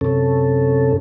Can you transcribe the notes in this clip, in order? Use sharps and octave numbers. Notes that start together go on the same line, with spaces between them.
F#2 C3 C#4 A4